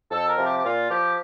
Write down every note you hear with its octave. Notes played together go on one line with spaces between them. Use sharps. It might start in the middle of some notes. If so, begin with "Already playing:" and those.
F2 A4
A#4
C3 F3
G4
G4
A#2 F4
F3 G4